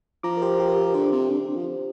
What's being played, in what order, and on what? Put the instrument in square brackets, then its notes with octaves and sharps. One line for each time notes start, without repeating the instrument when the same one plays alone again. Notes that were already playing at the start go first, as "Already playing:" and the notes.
[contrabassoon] F3 [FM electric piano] A#5 D6
[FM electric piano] A#4
G4 C5
G4
A#4
G4
A#4
[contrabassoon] D3 [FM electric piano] G4 C5
[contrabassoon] C3
D3
C3
D3
F3